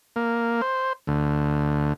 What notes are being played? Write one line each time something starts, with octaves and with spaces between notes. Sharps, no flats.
A#3
C5
D2